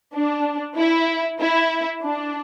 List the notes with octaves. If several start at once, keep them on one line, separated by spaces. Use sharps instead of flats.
D4
E4
E4
D4